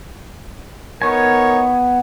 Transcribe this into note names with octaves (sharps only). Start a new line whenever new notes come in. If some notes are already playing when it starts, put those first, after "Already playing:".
B3 D#4 A#4 C#5 G#5